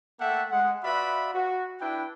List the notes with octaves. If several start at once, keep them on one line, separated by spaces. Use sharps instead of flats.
A3 A#3 A4 E5 F#5 G5
G#3 F#5
F4 F#4 B4 D5 E5 B5
F#4
D4 E4 B4 G5